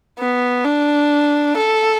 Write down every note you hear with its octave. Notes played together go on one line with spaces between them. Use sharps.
B3
D4
A4